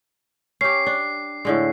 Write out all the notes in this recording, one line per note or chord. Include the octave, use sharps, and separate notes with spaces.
C#4 G4 C7
D4
A2 D3 G#3